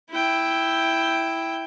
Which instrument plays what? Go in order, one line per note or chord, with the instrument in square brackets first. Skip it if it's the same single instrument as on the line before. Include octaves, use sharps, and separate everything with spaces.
[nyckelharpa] E4 G5